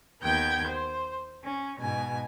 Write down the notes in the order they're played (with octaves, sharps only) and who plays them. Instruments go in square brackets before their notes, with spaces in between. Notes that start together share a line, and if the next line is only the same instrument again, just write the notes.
[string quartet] D#2 B3 G5 G6 G#6
C5
C#4
G#2 B2 G#5